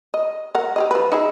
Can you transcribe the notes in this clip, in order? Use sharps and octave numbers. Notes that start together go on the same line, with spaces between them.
D#5
A#4 F#5
G4 G#4 D#5
F3 B4
D#4 E4 G#4